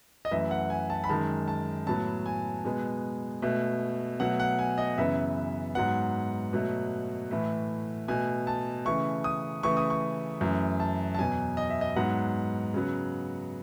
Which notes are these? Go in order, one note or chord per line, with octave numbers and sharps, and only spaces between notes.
D#5
F#2 E3 A3 E5
F#5
G#5
A5
B5
F#2 D#3 G#3 A5
A5
A2 F#3 B3 A5
G#5
B2 G#3 B3
B2 A3
B2 F#3 A3 F#5
F#5
G#5
D#5
F#2 C#3 E3 B3 E5
G#2 F#3 B3 F#5
B2 F#3 A3
A2 E3 A3
B2 A3 G#5
A5
C#3 E3 A3 C#6
D#6
C#3 E3 A3 C#6
D#6
C#6
F#2 E3 A3
A5
A5
E2 B2 F#3 G#5
D#5
E5
D#5
G#2 F#3 B3 F#5
C#3 F#3 B3